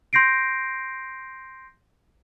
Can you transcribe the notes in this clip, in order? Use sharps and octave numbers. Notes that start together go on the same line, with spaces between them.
C6 G6 A#6 C7 D7